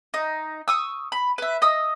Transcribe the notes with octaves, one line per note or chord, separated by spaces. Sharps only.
D#4
C#6 D#6 E6
B5
B4 E5
D#5 D#6 E6